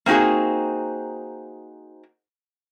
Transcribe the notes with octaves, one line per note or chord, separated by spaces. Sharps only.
A#3 C4 D#4 F#4 G#4